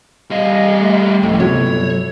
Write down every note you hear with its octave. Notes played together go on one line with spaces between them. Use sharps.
G3 D#5 F5
A3
C#2 A2 F3 A4
G1 C3 F#3 F#4 C#5